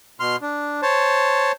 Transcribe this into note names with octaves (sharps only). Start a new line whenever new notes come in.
B2 C6 F6
D4
C5 C#5 A5